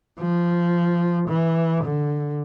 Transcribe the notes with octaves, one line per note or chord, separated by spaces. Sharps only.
F3
E3
D3